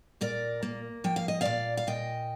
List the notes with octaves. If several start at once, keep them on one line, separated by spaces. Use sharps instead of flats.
A#2 A#4 D5
A#3
F3 G5
F5
D#5
A#2 D5 F5
F5
A#2 D#5 G5